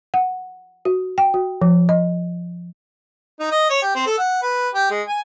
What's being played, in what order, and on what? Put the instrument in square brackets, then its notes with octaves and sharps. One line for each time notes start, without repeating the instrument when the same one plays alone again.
[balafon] F#5
F#4
G5
F#4
F3
D#5
[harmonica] D#4
D#5
C#5
G4
C4
A4
F#5
B4
G4
G#3
G#5